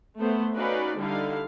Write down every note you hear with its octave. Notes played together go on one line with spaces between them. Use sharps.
A3 B3 C5
C#4 D#4 F#4 B4 D5 F5
D3 G3 D#4 E4 F5